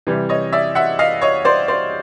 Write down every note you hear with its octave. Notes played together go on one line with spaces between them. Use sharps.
C3 E3 G3
C#5 D#5
D5 E5
E5 F#5
D#5 F5
C#5 D#5
C5 D5
C5 D5